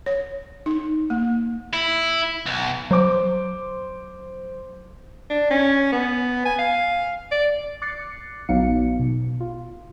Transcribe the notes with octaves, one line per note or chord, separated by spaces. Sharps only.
C#5
D#4
A#3
E4
B1
F#3 C5 D6
D4
C#4
B3
G#5
F5
D5
D6 F#6 A6 C7 C#7
A#1 F#3 B3 D#4 F5 C#7
B2
F4